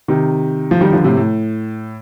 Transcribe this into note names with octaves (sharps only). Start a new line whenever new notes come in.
C3 D#3
F3
D#3 G3
D3 F3
A2 C3
A2